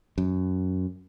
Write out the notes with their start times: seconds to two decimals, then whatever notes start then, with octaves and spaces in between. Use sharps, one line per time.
0.18 F#2